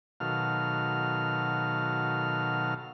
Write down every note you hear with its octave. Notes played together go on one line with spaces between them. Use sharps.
B2 D#3 F#3 A4 F5 F6